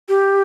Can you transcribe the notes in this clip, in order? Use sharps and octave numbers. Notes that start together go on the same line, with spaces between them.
G4